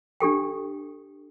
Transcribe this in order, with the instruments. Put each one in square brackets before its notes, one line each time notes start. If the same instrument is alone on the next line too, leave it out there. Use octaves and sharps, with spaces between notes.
[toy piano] D4 G4 A4 G5